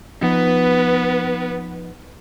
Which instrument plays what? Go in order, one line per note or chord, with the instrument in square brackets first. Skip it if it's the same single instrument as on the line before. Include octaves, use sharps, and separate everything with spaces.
[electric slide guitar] F3 D#4 [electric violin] B3 B4